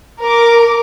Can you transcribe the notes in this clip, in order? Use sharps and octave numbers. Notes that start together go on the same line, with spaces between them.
A#4 D6